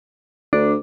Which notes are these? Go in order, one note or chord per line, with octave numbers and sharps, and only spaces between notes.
D2 D4